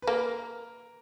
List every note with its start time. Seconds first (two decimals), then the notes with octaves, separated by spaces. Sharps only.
0.02 B4
0.07 A#3 A#4